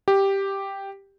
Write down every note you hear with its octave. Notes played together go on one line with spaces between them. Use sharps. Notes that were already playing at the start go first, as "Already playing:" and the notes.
G4